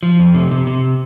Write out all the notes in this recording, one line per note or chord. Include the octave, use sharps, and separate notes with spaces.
F3
F2
C3
C3
C3